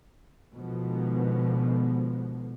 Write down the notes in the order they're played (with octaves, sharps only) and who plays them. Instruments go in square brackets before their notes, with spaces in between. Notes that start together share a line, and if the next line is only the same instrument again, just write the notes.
[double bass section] B2 D3 D#3 F3 G#3 B3